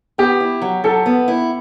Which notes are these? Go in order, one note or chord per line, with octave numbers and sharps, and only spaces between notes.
B3 G4
E4
F#3
F#3 A4
B3
E4